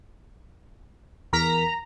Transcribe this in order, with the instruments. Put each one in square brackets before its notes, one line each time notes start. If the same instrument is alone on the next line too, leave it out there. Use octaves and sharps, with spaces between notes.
[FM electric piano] E2 A#4 B6 [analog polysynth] A#5